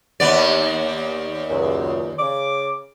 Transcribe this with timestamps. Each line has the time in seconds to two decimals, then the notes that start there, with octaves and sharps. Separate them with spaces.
0.20 D#2 B3 D5
1.50 C#2 F#2
2.19 C#3 D6